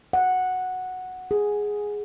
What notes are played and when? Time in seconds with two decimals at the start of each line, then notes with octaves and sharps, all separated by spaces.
0.13 F#5
1.31 G#4